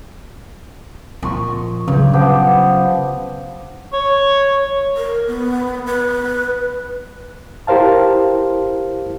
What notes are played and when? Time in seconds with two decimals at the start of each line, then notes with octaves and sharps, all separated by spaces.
1.23 A#2 F3 D#5 C6 C#6
1.88 G2 C#3 F#3
2.13 F3 B3 G4
3.93 C#5
4.97 A#4
5.27 B3
5.87 B4
7.67 E4 G4 A#4 C5 F5 A5